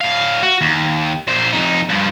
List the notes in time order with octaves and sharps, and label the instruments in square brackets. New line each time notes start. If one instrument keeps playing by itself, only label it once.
[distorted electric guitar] A2 F5
F#4
D#2
A#2 C5
F2 D#4
G2 F3